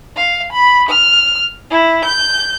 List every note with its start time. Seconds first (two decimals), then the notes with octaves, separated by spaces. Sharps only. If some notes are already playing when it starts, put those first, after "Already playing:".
0.17 F5
0.53 B5
0.89 F6
1.71 E4
2.05 G6